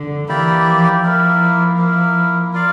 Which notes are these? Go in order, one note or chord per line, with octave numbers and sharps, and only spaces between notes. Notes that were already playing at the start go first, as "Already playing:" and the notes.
Already playing: D3
E3 A#3 E4 G4 D5
F3
A#3 E4 A#4
A#3 E4 A#4
F4 A#4 D5 F5